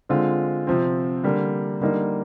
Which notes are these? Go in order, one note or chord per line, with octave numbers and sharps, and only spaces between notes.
D3 G#3 C4 F4
C3 F3 C4
D3 G3 A#3
D3 G3 A#3 D#4